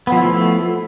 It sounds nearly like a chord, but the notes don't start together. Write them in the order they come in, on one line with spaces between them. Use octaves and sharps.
B3 F3 E4 A3